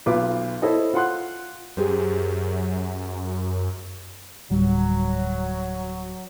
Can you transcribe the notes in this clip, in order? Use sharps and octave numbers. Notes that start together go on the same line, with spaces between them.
B1 F4 B4 D6
E4 A4 C5 C#5 D#5
F4 F#5 C6 F#6
F#2 G4 G#4 C5
D1 F#3 G3